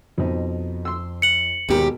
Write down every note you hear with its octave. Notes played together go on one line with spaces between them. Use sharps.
F2 B2 D#4
C6 E6
C#7 F#7
D#2 G#2 B2 G4 A#4